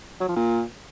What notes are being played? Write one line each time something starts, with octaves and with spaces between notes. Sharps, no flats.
F#3
F3
A#2